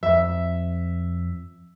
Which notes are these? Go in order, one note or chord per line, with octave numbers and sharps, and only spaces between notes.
F2 E5